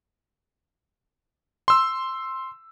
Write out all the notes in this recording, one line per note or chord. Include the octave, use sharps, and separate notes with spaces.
C6 E6